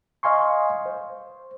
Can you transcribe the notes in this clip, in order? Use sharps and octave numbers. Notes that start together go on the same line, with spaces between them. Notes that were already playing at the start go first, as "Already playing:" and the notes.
D#5 F5 G#5 C6 C#6
C5